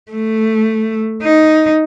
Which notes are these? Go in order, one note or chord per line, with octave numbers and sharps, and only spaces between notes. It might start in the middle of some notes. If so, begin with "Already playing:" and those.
A3
D#4